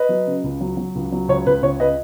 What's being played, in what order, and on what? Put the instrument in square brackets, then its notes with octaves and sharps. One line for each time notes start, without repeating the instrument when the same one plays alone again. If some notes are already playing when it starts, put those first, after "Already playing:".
Already playing: [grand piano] B4 D#5
F#3
C#3
C#2
F#3
F#3
C#2
F#3
C#2 C#5
C#2 B4
C#2 C#5
C#3 B4 D#5